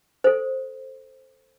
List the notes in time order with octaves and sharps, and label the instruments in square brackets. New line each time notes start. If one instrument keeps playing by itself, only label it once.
[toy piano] A4 C5